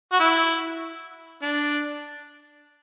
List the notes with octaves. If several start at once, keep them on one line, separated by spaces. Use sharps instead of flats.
F#4
E4
D4